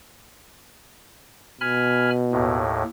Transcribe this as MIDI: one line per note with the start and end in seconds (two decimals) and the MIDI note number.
1.61 2.65 47
1.61 2.11 80
1.61 2.11 83
1.61 2.11 89
2.32 2.83 39
2.32 2.83 45